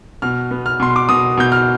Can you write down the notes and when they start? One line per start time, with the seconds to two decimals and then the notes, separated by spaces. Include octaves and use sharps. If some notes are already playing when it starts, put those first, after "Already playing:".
0.22 B2 F6
0.51 B3
0.66 F6
0.80 B2 C6
0.96 D6
1.09 B2 D#6
1.38 B2 G6
1.52 F6